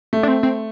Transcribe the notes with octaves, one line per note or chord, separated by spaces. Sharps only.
A3
D4
C4
C4